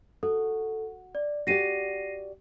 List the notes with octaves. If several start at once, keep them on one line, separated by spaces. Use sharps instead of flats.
F#4 A4
D5
F#4 G4 D5 A#6 C7 D#7